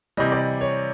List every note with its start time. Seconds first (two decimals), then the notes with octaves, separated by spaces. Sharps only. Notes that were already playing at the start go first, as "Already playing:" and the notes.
0.17 C3 E3 G3 D#5
0.32 D5
0.61 C#5